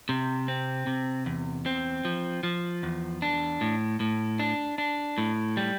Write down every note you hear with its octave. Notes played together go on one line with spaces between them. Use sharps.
C3
C4
C3
E2
C4
F3
F3
E2
D4
A2
A2
D4
D4
A2
G3